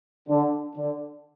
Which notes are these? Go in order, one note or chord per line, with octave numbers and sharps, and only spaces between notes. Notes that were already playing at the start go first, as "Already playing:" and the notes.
D3
D3